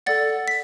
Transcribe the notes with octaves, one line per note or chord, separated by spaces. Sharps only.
A4 D5 F#5 A6
B6